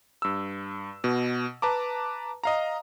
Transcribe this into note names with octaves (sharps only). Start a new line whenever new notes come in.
G2 E6
B2
B4 A5 A#5 D6
D#5 F5 A#5